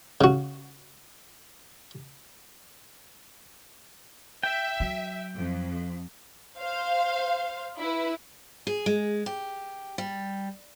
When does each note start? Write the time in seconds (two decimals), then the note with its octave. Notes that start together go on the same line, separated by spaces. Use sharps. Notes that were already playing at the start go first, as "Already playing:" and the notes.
0.21 C#3 F#4
4.43 E5 G5
4.80 F#3
5.36 F2
6.59 C5 F5
7.79 E4 B4
8.67 G#4
8.86 G#3
9.26 G4
9.98 G3